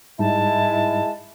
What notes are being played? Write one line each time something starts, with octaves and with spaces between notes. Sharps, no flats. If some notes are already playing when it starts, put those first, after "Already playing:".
G#2 G3 G#3 D#4 E4 A5